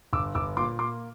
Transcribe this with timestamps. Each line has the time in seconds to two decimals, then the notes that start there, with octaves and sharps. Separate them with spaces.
0.13 G1 D6 E6
0.35 G1 D6 E6
0.57 A#2 C6 D6
0.79 A#3 C6 D6